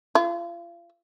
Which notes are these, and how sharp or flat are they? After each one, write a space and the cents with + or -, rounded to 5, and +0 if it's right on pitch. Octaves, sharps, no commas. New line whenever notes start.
F4 -35